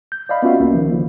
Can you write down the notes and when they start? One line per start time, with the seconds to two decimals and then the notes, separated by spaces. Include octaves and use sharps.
0.12 G6
0.29 D5 D#5 F5 B5
0.43 B3 C#4 F4 F#4 E5 F5
0.59 C2 A#3 C#4
0.74 D#3 F3
0.91 D3 F3